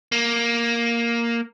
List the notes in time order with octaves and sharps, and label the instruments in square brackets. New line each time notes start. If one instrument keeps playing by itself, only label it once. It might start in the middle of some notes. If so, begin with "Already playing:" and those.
[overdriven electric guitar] A#3